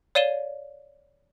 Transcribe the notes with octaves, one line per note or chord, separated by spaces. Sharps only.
C#5 D5 F5 D#7 E7 G7